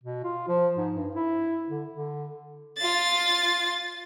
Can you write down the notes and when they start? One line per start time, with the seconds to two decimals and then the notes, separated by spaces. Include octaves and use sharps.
0.03 B2
0.23 F4
0.48 F3
0.77 G#2
0.94 G2
1.15 E4
1.69 D3
1.93 D3
2.78 F4 A6